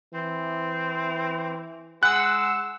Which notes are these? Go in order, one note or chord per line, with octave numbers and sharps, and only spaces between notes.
E3 C4
G#3 F#5 E6 F#6